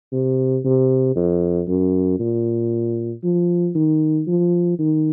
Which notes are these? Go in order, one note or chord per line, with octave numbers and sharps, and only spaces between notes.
C3
C3
F2
F#2
A#2
F3
D#3
F3
D#3